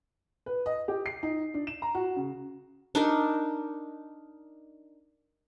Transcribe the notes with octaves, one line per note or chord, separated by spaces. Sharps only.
B4
D#5
G4
C7
D#4
D4
E7
A#5
F#4
C#3
D4 D#4 A#4